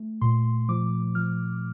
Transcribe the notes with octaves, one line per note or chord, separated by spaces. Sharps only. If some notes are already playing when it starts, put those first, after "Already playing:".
Already playing: A3
A#2 C6
F3 D6
F3 F6